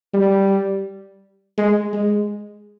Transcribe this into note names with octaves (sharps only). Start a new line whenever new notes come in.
G3
G#3
G#3